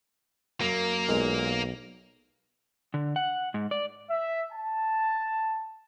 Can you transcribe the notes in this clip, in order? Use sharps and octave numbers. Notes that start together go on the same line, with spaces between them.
F#2 A#3
B1 A#2 G#3
D3
F#5
G#2
D5
E5
A5